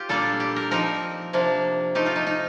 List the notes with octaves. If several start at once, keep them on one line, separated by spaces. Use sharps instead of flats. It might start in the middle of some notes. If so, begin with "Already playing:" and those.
Already playing: F4 G4
A#2 G3 A#3 D4 A4
G4
A#4
F3 C4 D#4 A#4
C3 F3 A#3 D4
F3 A3 D#4 G4
F4
D#4
D#4